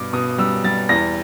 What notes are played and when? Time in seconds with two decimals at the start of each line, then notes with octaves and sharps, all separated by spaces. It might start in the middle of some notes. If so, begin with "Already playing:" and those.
Already playing: G2 B2 D6
0.13 B2 D#6
0.38 G3 E6
0.64 G3 A6
0.89 E2 A#6